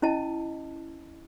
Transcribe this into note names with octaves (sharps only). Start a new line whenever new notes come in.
C#4 E4 D#5 A5